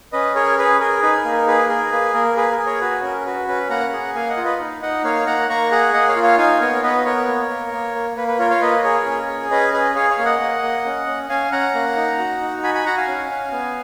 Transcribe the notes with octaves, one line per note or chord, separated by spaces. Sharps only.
C#4 B4 D#5
G#4 A#4 C#5
G#4 B4
G#4 A#4
D#4 B4
A#4
A#3
A#4
G#4 B4
G#4 A#4
A#3 B4
A#3 A#4
G#4 B4
A#4
G#4
A#4 C#5
F#4 B4
C#4 A#4
F#4 B4
C#4 B4
A#3 F#5 A#5
G#4
A#3 F5 G#5
D#5 F#5
F4
B4 D#5
D#4
D#4 D#5 F#5
A#3 C#5 F5
A#3 F#5 A#5
A#3 A#5 C#6
G#4 F#5 A#5
A#3 D#5 F#5
C#5 F5
F4
C#5 F5
D#4 F5 G#5
B3 A#4 C#5
B3 B4 D#5
B3 A#4 C#5
A#3
A#3
A#3
A#3
A#3 B4
B4
F4 A#4 C#5
C#5 F5
A#3 B4 D#5
G#4 A#4 C#5
C#4
G#4
C#4 B4 D#5
G#4 B4 D#5
G#4 C#5 F5
C#5 F5
A#3
D#5 F#5
A#3
A#3
C#4
C#4
C#4 F5 G#5
C#4 F#5 A#5
A#3
D#4
F#4
D#4
F#4 G#5 B5
G#5 B5
F#4 F#5 A#5
F5 G#5
C#4
C#4
B3